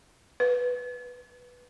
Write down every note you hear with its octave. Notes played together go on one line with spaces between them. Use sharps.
B4